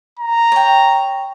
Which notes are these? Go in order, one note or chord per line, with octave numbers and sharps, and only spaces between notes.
A#5
C#5 G5